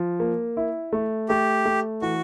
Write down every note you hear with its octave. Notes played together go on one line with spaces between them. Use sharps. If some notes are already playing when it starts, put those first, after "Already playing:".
Already playing: F3
A#3
E4
A3
A3 G4
A3
E3 F#4